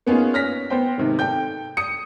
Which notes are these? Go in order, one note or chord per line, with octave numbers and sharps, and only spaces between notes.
A#3 B3 C#4 D#4 F4 G#4
C#5 F6 A#6 B6
B3 C5 G5
G#2 C3 D#3
A4 G5 G6
D#6 C#7